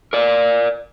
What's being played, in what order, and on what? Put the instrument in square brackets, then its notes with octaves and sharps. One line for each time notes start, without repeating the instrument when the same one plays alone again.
[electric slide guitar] A#4 D5